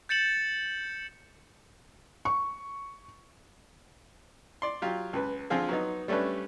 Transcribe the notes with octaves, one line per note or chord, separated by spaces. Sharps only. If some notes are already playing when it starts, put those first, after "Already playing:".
G6 A6 C#7 E7 F#7
C#6
D5 C6
F#3 F4 G4
C#2 B4
D3 F3 C4 F4 G#4
F#3 B3 D#4
G3 A3 C#4 D4 B4